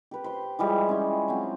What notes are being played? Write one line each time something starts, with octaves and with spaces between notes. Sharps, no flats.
G4 B4
C5 C6
E3 F3 G3 G#3
C#4 E4
F#3 C4